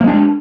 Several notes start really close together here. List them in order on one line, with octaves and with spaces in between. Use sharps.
A#3 G#3 D4